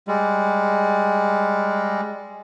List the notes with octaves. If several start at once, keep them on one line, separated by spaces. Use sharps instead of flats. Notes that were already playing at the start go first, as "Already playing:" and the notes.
G3 G#3